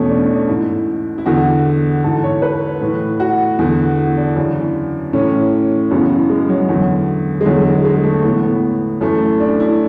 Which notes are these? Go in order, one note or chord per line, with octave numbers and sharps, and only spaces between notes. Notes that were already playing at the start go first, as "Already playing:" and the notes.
Already playing: E2 B2 A3 C#4
D4
C#4
G#2 E3 E4
E4
E2 D3 F#4
G#2 E3 A4
C#5
B4
A2 E3
F#4
E2 D3
E4
D4
F#2 C#3 E3
A2 E3 C#4
F#2 C#3 E3 B3
G#3
F#3
E2 D3 F#3
G#3
E2 D3 F#3
G#3
G#3
A3
A2 E3 B3
B3
F#2 E3 A3
D4
E4